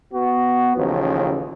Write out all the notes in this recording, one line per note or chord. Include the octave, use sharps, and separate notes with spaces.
B3 F#4
A1 D#2 C#3 F3